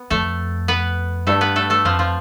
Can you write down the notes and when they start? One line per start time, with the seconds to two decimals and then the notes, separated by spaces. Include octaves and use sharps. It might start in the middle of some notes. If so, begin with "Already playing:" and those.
Already playing: B3
0.10 F2 A3 A4
0.68 B3 B4
1.27 G2 A3 A4
1.41 B3 B4
1.56 A3 A4
1.70 A3 A4
1.85 F2 F3 F4
1.99 F3 F4